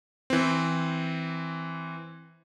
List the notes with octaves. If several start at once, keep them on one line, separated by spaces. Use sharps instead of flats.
E3 C4